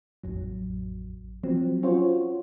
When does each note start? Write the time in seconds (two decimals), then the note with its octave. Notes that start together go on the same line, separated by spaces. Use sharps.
0.23 A1 F2 F#3
1.43 F3 F#3 C4
1.83 C#4 F4 F#4 C5 C#5